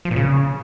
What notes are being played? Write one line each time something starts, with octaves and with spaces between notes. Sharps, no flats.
F3
A#2
C#3